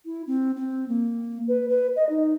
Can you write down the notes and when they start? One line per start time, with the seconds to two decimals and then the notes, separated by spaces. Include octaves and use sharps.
0.06 E4
0.27 C4
0.56 C4
0.88 A#3
1.48 B4
1.69 B4
1.96 D#5
2.09 D#4